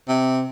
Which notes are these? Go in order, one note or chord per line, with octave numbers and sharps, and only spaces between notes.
C3